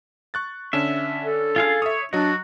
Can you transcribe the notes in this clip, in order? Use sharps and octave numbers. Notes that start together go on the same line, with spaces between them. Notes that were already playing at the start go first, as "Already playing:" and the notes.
C#6 F#6 A6
D3 C#4 D4 E5
A4
F4 G#4 F5
C#5 E5 D#6
F#3 D4 F#4 D#5